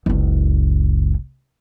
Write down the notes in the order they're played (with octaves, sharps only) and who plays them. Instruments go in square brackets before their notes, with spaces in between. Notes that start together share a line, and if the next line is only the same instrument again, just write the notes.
[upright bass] F#1 C#2